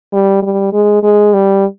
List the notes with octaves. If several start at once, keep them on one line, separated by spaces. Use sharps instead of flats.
G3
G3
G#3
G#3
G3